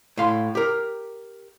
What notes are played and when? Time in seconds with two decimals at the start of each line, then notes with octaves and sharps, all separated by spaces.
0.17 A2 F5 C6
0.55 G4 A#4